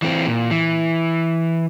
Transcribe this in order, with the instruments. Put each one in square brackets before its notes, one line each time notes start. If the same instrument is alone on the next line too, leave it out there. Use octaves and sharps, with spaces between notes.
[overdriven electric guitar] E3 C4
A#2
E3